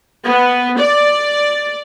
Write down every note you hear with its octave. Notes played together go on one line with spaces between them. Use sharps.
B3
D5